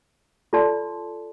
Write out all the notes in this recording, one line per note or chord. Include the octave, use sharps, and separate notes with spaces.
F4 A4 D5 A5 C6